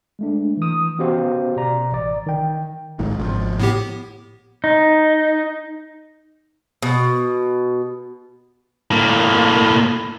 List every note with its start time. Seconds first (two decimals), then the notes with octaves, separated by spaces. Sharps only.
0.19 G#3 A3 D4
0.57 E3 D#6
0.99 B3 C#4 F#4 G4 C5 F5
1.56 B2 D5 A#5
1.92 A1 D5
2.26 D#3 G5
2.99 A#1 G#2 D#3
3.19 G#1 C3 F3
3.59 A2 B3 G4
4.64 D#4
6.82 B2
8.91 A2 A#3